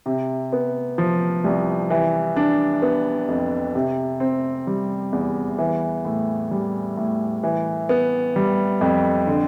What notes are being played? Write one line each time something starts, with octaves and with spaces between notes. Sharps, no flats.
C3
B3
F3
C2
E3
D4
B3
F2
C3
C4
G3
E2
E3
A2
G3
A2
E3
B3
G3
F2
D3